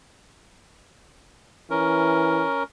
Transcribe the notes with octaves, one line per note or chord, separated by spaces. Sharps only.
E3 C#4 A#4